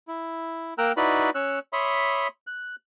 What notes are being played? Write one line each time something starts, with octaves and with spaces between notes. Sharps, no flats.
E4
A#3 A#4 G5 A#5 E6 F#6
D#4 E4 F#4 B4 D5 B5
C#4 C#5 E6 F#6
C#5 E5 B5 C6 D#6
F#6